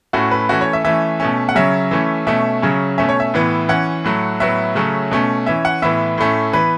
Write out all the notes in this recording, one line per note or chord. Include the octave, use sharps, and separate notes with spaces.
A2 A3 C#4 F#4
B4
E3 A3 C#4 F#4
C#5
E5
E3 A3 C#4 E5
B2 A3 C#4
F#5
C#3 F#3 C#4 E5
E3 A3 C#4
B2 A3 C#4 E5
C#3 F#3 C#4
B2 A3 C#4 E5
C#5
E5
A2 E3 B3
E3 C#4 F#5
A2 F#3 A3
A2 F#3 B3 E5
C#3 F#3 A3 C#4
B2 A3 C#4
E3 C#4 E5
F#5
A2 E3 B3 E5
A2 A3 C#4
E3 B3 B4